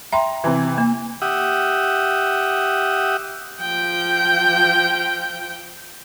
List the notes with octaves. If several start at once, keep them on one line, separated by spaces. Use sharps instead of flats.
E5 G5 A#5 C6
C3 E3
A#3
G4 E5 F#5 D#6
F3 G5